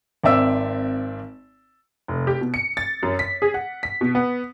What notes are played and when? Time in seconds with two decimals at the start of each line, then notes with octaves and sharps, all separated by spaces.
0.24 G#1 C4 D5 E5 E6
2.08 F1
2.27 G4
2.41 B2
2.54 C#7
2.77 A6
3.03 F#2
3.19 B6
3.42 G#4
3.54 F#5
3.83 B6
4.01 B2
4.15 B3